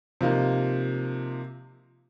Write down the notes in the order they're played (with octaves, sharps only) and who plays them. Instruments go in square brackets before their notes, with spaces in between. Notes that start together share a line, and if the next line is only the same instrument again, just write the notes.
[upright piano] C3 F3 A#3 D#4